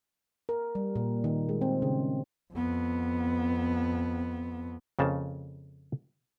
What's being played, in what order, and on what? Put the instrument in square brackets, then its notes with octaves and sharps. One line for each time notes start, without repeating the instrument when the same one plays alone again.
[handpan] A#4
G3
A#2
D#3
G#3
C4
C#3
[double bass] F2 B3
[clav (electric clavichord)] F2 C#3 A#3 A5